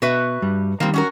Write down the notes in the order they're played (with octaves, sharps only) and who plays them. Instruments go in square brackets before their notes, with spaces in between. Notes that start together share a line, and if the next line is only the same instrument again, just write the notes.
[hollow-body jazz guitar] B2 [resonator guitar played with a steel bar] F#4 B4 E5
[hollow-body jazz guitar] G2 G3
[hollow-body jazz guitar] D#3 G3 [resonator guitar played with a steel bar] A#3 C4
[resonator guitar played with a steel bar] C#4 F#4 A#4